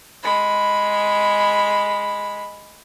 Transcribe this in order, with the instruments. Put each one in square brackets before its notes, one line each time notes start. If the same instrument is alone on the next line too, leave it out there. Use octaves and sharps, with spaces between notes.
[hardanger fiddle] G#3 B5